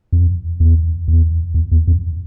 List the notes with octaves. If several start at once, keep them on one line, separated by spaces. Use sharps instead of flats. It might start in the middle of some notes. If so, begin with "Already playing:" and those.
F2
E2
E2
E2
E2
F2